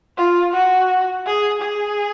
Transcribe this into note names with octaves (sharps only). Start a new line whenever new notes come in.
F4
F#4
G#4
G#4